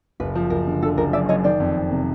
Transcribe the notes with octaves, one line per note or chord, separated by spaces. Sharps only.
F#1 B4
F3
F#1 A#4
D3
D3 A4
F#1 A#4
F#2 D5 E5
F#2 C#5 D#5
D#3 C5 D5
F2
F2
C3